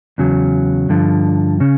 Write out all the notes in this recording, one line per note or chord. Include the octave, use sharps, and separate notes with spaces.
E2 C#3 F#3
G2 D3 F3
C#3 C#4